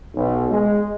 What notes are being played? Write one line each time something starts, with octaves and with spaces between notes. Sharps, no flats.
B1
G#3